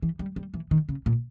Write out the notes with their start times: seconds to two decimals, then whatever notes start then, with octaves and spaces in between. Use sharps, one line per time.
0.02 E3
0.19 G3
0.36 G3
0.54 E3
0.71 D#3
0.89 C#3
1.06 A#2